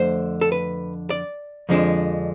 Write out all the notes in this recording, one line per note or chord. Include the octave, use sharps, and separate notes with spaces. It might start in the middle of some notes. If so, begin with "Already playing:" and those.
Already playing: F2 D3 A3 C5
A4
B4
D5
F2 D3 F3 G#3 D4